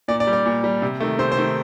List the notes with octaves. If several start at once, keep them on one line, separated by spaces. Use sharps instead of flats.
A#2 D5
D5
G3
D5
A#2
G3
C3
D#3 A3
C3 C5
C5
D#3 A3